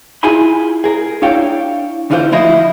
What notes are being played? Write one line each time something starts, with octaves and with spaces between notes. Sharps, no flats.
E4 F4 G#4 G#5 B5 C6
G#4 A#4
D4 E4 C#5 F5 G5
E2 D3 E3 F4 F#4 C5
D2 F3 E4 F4 D#5